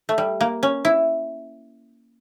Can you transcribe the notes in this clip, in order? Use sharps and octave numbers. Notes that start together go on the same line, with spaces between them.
A3
G3
A#3
C#4
E4